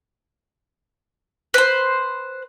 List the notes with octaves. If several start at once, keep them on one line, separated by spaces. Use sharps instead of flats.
B4 C5